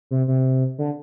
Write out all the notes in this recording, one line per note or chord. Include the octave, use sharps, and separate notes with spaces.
C3
C3
D3